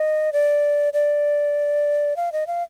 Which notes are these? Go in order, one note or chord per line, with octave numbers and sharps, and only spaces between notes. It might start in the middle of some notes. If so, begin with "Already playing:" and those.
Already playing: D#5
D5
D5
F5
D#5
F5